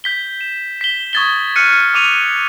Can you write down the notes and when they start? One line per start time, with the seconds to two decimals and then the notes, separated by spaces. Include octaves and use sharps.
0.04 G6 B6 G7
0.41 E7
0.81 B6 G7
1.13 C#6 D#6 G#6 A6 B6 G7
1.56 F6 F#6 C#7 D#7
1.94 C#6 D6 D#7 F7